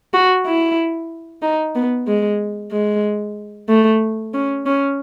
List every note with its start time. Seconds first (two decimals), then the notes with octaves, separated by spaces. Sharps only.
0.14 F#4
0.46 E4
1.42 D#4
1.75 B3
2.07 G#3
2.72 G#3
3.69 A3
4.34 C#4
4.66 C#4